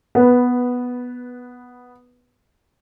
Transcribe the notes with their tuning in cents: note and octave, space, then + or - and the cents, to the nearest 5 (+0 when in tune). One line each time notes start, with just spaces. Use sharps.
B3 +0 B4 -10